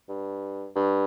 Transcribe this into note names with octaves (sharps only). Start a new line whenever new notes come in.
G2
G2